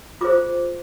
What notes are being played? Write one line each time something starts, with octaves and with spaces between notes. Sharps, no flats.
F4 G#4 C5 D6